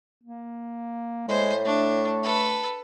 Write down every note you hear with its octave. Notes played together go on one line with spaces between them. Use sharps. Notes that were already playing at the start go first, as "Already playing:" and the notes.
A#3
A2 G#3 C5
A3 D4
A4 B4